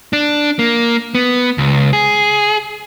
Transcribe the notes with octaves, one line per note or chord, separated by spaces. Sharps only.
D4
A#3
B3
C#2
G#4